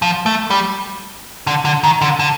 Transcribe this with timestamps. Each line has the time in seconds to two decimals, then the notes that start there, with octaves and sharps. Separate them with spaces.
0.02 F3
0.26 A3
0.50 G3
1.47 D3
1.65 D3
1.84 D#3
2.01 D3
2.19 D3